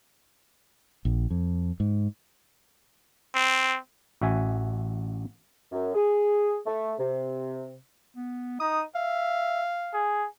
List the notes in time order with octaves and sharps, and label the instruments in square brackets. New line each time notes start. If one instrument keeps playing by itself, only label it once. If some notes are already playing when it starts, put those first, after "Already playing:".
[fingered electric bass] A#1
F2
G#2
[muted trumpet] C4
[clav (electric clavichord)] A1 F#4 E5 G#5
[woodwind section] F#2
G#4
A3
C3
[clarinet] B3
[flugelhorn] D#4 [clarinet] D#6
[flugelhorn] E5 [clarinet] F5
[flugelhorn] G#4